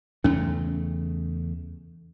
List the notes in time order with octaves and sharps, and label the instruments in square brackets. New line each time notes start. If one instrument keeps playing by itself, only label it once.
[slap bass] E2 C#3 A3 [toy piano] C#4